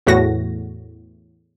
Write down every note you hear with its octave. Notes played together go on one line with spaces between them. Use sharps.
E2 A2 F#4 A#6